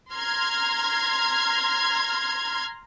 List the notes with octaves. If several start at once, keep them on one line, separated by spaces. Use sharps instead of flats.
A#5 C6 F6 G#6